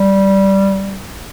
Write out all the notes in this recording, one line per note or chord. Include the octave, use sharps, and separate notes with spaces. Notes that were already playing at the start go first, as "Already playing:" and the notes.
Already playing: G3